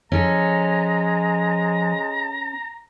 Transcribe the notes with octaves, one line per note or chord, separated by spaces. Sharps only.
F3 G#3 C#4 A4 A#5